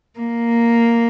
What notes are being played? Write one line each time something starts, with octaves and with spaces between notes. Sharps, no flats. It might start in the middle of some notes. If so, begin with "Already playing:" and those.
A#3